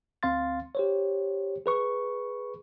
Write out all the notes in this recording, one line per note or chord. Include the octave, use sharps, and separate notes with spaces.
D2 C4 F5 C6 A6
G4 C5 C#5
G#4 B4 C#6